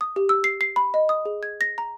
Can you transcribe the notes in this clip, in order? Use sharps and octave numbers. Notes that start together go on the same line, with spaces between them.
D#6
G4
E6
C7
C7
B5
D#5
D#6
G#4
G#6
A#6
A#5